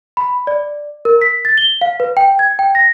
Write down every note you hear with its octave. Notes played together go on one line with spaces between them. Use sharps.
B5
D5
A#4
B6
A6
G7
F5
B4
G5
G#6
G5
A#6